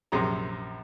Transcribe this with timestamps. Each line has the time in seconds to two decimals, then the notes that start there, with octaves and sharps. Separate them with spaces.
0.12 A#1 F#2 C3 G#4 A#5